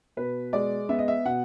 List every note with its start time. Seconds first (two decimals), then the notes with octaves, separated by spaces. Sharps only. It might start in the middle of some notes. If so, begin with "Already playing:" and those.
0.17 B2 B4
0.53 G#3 D5
0.89 B3 E5
0.99 D#5
1.08 E5
1.25 B2 F#5